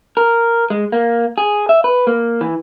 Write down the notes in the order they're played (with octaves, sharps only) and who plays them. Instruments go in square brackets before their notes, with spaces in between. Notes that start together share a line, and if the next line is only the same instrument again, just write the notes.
[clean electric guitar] A#4
G#3
A#3
G#4
E5
B4
A#3
E3